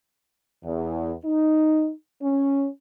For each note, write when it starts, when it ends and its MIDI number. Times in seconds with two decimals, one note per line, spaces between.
0.64 1.13 40
1.25 1.90 63
2.22 2.67 61